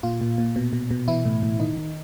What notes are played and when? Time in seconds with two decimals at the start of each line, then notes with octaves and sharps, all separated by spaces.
0.03 A#2 F4
0.21 A#2
0.38 A#2
0.56 B2
0.73 B2
0.91 B2
1.08 E3 E4
1.25 A2
1.43 A2
1.60 D#3 D#4
1.77 D#3